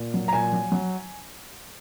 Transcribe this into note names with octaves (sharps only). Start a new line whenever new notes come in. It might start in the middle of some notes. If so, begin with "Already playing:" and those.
Already playing: A#2
F#3
A#5
A#2 G#5
F#3
F#3